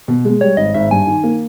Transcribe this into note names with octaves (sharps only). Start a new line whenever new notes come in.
B2
G#3
G3 C#5
G#1 D#5
G#1 E5
G2 G#5
D#3
A#3